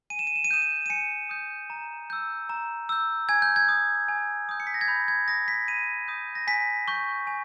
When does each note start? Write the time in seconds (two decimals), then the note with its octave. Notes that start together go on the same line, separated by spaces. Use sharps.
0.10 G#5 D#7
0.19 E7
0.27 D#7
0.36 E7
0.44 D#7
0.51 D#6 G6 E7
0.62 D#7
0.86 D#7
0.90 G#5 C#7
1.29 D#6 G6
1.70 A#5
2.10 E6 G6
2.49 A#5
2.89 E6 G6
3.29 G#5 G#6
3.42 G6
3.56 G#6
3.69 D#6 G6
4.09 G#5
4.49 D#6 G6
4.60 C#7
4.67 B6
4.74 A#6
4.81 G#6
4.88 B5 G6
5.08 G#6
5.28 D#6 G6 A#6
5.48 B6
5.68 B5 D#7
6.08 D#6 G6
6.35 A#6
6.47 G#5 B6
6.88 C#6 G6
7.27 G#5